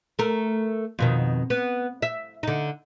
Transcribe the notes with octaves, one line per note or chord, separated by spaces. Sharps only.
A3 A#4
F2 B2 D#3
B3
E5
D3 D#4